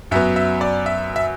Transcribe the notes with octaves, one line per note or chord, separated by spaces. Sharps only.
F#2 F#3 B3 E5
E5
D5
E5
E5